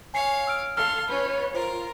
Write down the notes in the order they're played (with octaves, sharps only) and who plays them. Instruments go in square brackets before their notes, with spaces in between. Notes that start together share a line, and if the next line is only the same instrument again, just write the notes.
[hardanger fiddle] C#5 F5 [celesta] G#5 C7 C#7
[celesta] E6 F6 D7
[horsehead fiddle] A4 F5 [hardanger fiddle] C6 [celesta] F6
[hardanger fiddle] C#4 F4 [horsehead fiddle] B4 C#5
[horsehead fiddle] F4 [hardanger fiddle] A#4 [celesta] C5